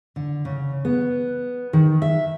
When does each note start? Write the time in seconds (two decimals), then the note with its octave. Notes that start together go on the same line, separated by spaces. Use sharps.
0.16 D3
0.45 C#3
0.85 B3
1.73 D#3
2.02 E5